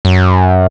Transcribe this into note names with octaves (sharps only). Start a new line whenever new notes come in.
F#2